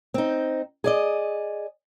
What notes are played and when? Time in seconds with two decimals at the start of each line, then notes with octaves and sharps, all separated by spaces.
0.14 C4 D#4
0.84 G#4 D5 D#5